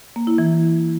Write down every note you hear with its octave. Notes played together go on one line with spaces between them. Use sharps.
A#3
E4
E3